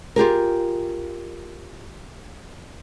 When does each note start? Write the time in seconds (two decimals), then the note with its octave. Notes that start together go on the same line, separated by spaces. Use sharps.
0.16 F4 G4 G#4 A#4